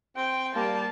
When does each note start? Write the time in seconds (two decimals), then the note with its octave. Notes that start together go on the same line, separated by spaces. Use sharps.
0.17 C4 G5
0.55 G3 A#3 A5